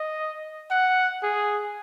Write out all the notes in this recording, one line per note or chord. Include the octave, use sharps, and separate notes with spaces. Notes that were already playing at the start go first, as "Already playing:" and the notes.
Already playing: D#5
F#5
G#4